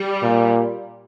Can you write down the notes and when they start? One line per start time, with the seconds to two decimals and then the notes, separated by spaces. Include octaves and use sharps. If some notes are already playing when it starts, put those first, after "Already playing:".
Already playing: G3
0.22 A#2